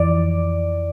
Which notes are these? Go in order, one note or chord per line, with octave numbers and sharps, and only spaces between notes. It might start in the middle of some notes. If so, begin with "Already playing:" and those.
Already playing: F2 E3 D5